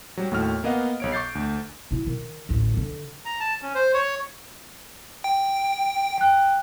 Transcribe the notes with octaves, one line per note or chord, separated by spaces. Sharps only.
F#3 G3
D#2 A2 F#4 F6
A#3 B3 D#5 F5 F#5
B1 C#5 D7
C#6 D6 G6 A6 C7
D2
B2 E4
D#3
A1 D2
D3
A#5
A5
C#4
C5
C#5
G5
G5 F#6